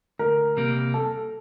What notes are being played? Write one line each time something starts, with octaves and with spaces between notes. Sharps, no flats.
D2 A#4
C3 G3 A#3
A4